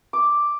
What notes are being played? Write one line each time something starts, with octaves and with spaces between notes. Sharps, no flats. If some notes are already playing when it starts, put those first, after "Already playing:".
D6